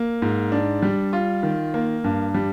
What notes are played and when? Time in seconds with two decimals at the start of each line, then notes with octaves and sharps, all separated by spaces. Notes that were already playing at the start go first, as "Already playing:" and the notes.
Already playing: A#3
0.22 G#2
0.52 D4
0.82 G3
1.13 F4
1.43 D#3
1.74 A#3
2.04 G2
2.34 G3